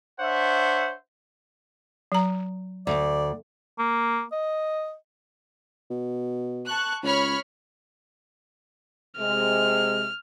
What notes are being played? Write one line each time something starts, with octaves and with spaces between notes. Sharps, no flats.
D4 C5 C#5 E5 F#5
F#3 A#5
D2 D5
A#3
D#5
B2
A5 C#6 F#6
C#2 C#5 B5 F6
C3 G#3 F6